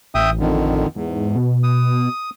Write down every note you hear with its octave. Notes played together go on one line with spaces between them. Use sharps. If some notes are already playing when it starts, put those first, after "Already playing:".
A1 E5 G5 D#6
F2 D3 D#3
E2 G#2
B2
D#6